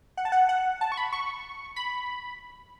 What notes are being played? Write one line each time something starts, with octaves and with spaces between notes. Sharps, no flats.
F#5
A5
F#5
F#5
A5
C#6
B5
C#6
B5